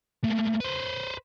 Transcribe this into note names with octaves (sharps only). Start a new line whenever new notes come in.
A3 A#3
B4 C5